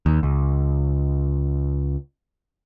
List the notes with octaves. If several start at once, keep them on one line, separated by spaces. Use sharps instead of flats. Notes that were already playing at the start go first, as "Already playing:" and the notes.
D#2
C#2